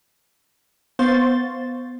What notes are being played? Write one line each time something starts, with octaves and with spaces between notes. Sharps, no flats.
B3 C5 F5 C6 C#6 A6